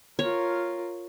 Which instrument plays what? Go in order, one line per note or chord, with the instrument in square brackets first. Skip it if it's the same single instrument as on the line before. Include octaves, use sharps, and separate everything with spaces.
[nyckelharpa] F4 A#4 [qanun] C#5